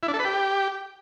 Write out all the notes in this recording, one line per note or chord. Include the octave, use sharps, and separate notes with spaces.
E4
D4
A4
B4
G4